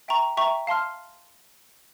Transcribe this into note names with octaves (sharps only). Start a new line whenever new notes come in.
E5 G5 A#5 C#6
E5 G5 A#5 C#6
F5 A5 C6 F6